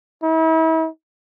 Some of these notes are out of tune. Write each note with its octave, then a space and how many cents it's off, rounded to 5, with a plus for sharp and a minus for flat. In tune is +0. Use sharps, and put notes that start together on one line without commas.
E4 -40